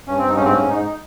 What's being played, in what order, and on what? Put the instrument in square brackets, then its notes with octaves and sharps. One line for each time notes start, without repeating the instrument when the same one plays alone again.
[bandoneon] G2 C#4
G2 C4
D#4
G#2 C#4
C4
G#2 C#4
G#2 D#4
D#4